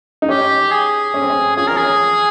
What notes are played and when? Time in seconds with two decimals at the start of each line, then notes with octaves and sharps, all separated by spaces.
0.22 D#4
0.28 C#4 G4
0.72 G#4
1.14 C#4
1.22 C4
1.30 C#4
1.56 C#4 F4 G#4
1.67 C#4 F4 A#4
1.77 G#4
1.85 C#4